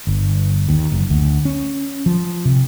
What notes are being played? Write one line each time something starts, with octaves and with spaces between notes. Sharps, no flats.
G1
D#2
F#1
D2
C#4
F3
C3